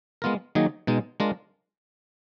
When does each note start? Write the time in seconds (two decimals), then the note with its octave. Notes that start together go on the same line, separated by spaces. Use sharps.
0.22 G#3 B3 F4 A#4
0.55 D#3 F#3 A#3 D#4 G#4
0.87 B2 G#3 D#4
1.20 G#3 D4 F4 A#4